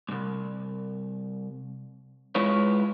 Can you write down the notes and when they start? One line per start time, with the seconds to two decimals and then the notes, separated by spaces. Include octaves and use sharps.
0.09 C2 G#2
2.35 G#3 E4 F4 B4 C#5